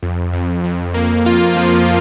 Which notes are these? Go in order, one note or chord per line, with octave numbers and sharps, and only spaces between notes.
F2
F2
F2
A#3
F4
F3